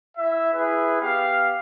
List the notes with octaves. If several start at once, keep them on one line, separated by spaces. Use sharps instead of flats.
E4 E5
E4 G#4 B4
B3 G4 F5